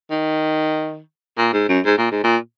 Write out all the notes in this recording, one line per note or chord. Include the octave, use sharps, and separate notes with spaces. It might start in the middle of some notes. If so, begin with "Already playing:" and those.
D#3
A#2
G#2
F#2
G#2
A#2
G#2
A#2